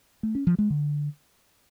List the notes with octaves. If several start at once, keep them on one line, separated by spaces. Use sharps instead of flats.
A3
C#4
F3
G#3
D3